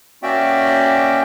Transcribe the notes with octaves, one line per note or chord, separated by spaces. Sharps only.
A#3 C#4 F#4 D5 E5 G5